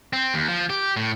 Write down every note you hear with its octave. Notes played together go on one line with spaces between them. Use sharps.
C4
D#2
F3
G4
A2